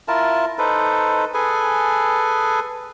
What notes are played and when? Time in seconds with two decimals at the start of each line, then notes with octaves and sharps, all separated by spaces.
0.08 E4 F4 A#4 A5
0.58 D#4 A4 B4 C5
1.34 G#4 A4 B4 G#5